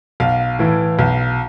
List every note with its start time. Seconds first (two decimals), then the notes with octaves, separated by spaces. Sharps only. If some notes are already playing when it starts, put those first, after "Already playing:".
0.20 B1 F5
0.59 A2 E3
0.99 B1